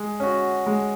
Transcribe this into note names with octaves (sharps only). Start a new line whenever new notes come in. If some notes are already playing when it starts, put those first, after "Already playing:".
Already playing: G#3
C#4 F#4
G#3